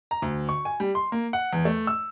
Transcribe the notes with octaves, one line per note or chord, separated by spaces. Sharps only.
A#5
D2
C#6
G#5
G3
C6
A#3
F#5
E2
A3
E6